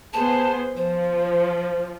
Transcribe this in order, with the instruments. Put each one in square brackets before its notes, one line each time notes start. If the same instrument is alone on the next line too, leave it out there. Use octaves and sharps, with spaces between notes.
[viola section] B3 G#4 C5 [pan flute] A5
[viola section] F3 [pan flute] C5